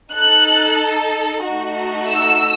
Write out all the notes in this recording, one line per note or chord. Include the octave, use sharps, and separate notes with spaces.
D#4 A4 F#6
A3 D#4 F#4
E6